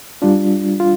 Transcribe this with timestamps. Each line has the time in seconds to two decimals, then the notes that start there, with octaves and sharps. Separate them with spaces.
0.22 G3 D4 F4
0.80 F4